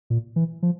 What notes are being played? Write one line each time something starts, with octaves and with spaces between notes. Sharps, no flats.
A#2
E3
F3